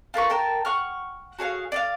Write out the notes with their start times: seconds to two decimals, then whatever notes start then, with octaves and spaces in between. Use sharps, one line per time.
0.14 F4 A#4 B4 C#6
0.30 A#4 G5 A5
0.65 F#5 C#6 F6
1.39 F#4 G#4 C#5 F5
1.72 D5 D#5 F5